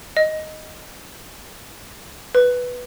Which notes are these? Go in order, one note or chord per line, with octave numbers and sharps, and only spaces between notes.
D#5
B4